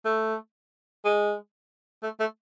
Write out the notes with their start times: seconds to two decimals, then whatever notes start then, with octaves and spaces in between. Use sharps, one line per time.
0.05 A3
1.04 G#3
2.03 A3
2.20 A3